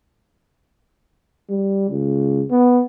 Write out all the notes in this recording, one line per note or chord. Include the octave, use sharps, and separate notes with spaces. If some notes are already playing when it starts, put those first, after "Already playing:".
G3
C#2
B3